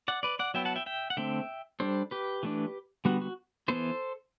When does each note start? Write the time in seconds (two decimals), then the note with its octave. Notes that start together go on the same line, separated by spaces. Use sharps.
0.08 D5 F#5
0.23 B4 D5
0.39 D5 F#5
0.54 F#3 B3 E4 E5 G5
0.65 F#5 A5
0.76 E5 G5
0.86 E5 G5
1.10 F#5
1.17 D3 A3 C4 E5 G5
1.80 G3 D4 A4 C5
2.11 G4 B4
2.43 E3 A3 D4
3.05 D3 G3 B3 F#4
3.21 F#4
3.68 E3 B3 E4 A4 C5